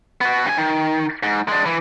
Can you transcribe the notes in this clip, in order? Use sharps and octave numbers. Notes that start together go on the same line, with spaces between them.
B3 F#4
G2 G#5
D#3
G#2
G#3 D4
E3